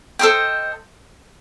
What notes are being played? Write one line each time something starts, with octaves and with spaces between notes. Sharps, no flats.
A4 C5 D#5 G5